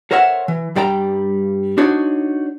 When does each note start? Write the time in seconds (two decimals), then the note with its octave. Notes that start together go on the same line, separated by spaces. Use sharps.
0.11 A4 A#4 C5 C#5 E5 F#5
0.48 E3
0.76 G2 G3 D5 G5 A#5
1.78 D4 D#4 F#4 C5 C#5